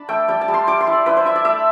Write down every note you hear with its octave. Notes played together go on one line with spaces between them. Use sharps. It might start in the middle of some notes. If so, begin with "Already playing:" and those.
Already playing: D4 A5 B5
A3 G5
G3 G5
A5
G3
C6
G3 D6
C6
E4
D5
E4 B4
C5
E4 E5
D5
A3 E5